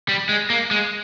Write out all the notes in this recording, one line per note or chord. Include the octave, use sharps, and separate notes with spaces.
G3
G#3
A#3
G#3